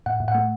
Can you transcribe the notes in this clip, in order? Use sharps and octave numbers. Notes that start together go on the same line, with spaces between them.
A2 F#5
A2
F#5
A3